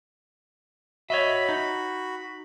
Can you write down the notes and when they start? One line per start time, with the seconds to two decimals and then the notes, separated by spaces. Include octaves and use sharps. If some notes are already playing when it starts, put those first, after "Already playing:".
1.10 F#4 C#5 D#5 E5 B5
1.49 D#4